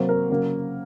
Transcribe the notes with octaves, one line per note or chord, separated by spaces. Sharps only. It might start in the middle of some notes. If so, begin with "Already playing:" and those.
Already playing: C3 F#3 A#3 C5
A#4
C#3 F#3 A#3